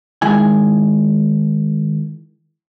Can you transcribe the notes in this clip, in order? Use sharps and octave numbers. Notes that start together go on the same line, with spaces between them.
D#3 G#3 E4 G#5